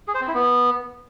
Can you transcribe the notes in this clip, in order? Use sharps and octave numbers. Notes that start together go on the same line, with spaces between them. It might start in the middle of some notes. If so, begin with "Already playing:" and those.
G#4
C5
C4
E4
B3